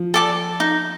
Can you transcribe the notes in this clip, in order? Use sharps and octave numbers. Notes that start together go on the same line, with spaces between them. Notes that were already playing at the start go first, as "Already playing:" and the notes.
Already playing: F3
A4 D5 A5
D#4